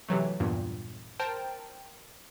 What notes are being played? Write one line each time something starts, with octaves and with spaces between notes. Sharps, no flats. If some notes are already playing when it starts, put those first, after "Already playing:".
C3 E3 F#3 A3
E2 G2 A#2
A#4 C5 G5 A5